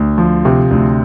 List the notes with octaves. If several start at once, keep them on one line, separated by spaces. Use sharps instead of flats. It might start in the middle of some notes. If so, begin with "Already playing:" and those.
Already playing: D2
F3
C3
D2